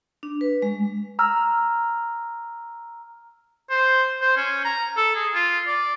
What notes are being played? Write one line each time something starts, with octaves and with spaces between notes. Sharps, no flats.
D4
B4
G#3
A#5 E6 F6
C5
C5
C#4
A#5
A4
G#4
F4
D5